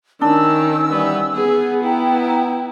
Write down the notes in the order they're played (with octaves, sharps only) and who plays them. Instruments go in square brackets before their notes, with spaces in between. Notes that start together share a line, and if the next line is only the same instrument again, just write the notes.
[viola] D#3 [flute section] C#4 E6 [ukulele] D4
[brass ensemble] E3 G3 B3
[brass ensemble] B3 [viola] G#4
[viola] E4 [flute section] G5 A#5